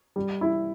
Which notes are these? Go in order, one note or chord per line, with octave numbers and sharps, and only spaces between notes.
G3
E4